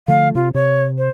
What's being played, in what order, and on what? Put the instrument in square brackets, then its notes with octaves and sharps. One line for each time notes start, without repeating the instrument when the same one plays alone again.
[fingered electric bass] D3 F3 A3 [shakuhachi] F5
[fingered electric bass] C3 [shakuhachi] F4
[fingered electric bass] C3 [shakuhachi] C#5
[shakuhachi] C5